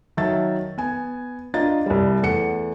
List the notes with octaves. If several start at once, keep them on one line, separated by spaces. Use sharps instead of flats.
D#3 F#3 E5 A5 A6
B3 G#5
D4 F4 D#5 A#5 A6
C2 G3
E2 A3 F#5 C#7